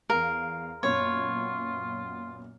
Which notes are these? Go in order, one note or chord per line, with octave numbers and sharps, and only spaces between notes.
E2 A#4 F5
F#2 A#2 B3 F4 C#5